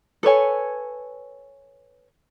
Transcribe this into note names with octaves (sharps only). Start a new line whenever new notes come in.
A4 B4 C#5 G#5